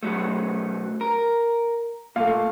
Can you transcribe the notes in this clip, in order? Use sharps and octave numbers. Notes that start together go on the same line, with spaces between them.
B1 F#3 A3
A#4
A#2 A3 F5